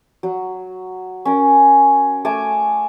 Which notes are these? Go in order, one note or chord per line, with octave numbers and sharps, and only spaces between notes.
F#3
C#4 A#4
A3 G#5 A5 D6